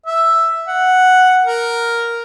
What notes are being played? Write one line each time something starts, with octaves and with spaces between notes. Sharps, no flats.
E5
F#5
A#4